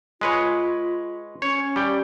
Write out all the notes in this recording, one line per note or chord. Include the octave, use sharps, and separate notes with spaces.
G#3 F4 B4 C#5
C#4 C#5
G3 G5